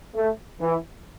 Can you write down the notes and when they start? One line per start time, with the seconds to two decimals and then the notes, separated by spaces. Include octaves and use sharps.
0.15 A3
0.61 E3